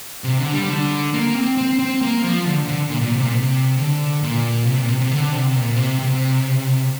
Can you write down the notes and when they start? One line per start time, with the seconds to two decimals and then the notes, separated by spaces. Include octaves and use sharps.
0.24 C3
0.39 D3
0.53 G3
0.69 D3
1.13 A#3
1.35 C4
1.57 C4
1.79 C4
2.01 A#3
2.24 F3
2.45 D3
2.68 D3
2.89 A#2
3.01 A#2
3.12 C3
3.22 A#2
3.34 C3
3.78 D3
4.22 A#2
4.66 C3
4.78 A#2
4.89 C3
5.00 C3
5.11 D3
5.32 C3
5.55 A#2
5.76 C3
5.99 C3